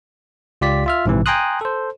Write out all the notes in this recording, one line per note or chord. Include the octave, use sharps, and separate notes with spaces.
C#2 F4 G4 D5 B6
F4 E5 F6
A#1 G#2 C3 E3
G5 G#5 A#5 C6 D#6 F#6
A4 C5